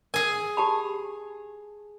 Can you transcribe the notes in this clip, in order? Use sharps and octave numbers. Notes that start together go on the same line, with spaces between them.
G#4 A#4 G#5
G4 A5 B5